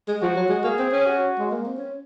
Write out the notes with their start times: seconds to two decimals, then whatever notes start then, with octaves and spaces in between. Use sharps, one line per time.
0.08 G#3
0.22 F3 F#4
0.36 F#3
0.50 G#3
0.64 A#3 G#4
0.79 C4
0.92 C#4
1.06 F#4
1.39 G#3
1.51 A#3
1.65 C4
1.78 C#4